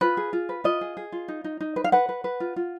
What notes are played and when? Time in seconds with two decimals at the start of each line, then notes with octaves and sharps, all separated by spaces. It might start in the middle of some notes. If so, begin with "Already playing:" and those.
0.01 F4 B4
0.17 G#4
0.33 F4
0.49 B4
0.64 F4 D#5
0.81 G#4
0.97 G#4
1.12 F4
1.28 D#4
1.44 D#4
1.60 D#4
1.76 B4
1.84 F5
1.92 B4 F#5
2.09 B4
2.24 B4
2.40 F4
2.56 F4